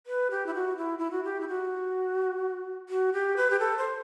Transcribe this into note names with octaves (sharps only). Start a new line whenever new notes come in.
B4
G4
E4
F#4
E4
E4
F#4
G4
E4
F#4
F#4
G4
B4
G4
A4
C5